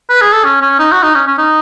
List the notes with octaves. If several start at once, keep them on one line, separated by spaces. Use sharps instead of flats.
B4
G#4
A4
C#4
C#4
D#4
F#4
D#4
C#4
C#4
D#4